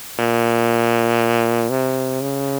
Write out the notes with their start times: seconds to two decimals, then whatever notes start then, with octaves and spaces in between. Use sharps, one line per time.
0.19 A#2
1.70 C3
2.22 C#3